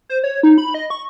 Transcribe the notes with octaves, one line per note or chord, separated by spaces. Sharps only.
C5
C#5
D#4
B5
D#5
C#6